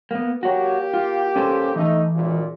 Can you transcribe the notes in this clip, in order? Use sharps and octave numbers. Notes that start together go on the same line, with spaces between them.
A#3 B3
A#3 F#4 G4 C#5
F4
C#4 A4 C5
E3 A3 D#4
G#1 C#2 A#2